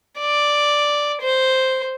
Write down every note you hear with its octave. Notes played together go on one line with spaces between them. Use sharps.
D5
C5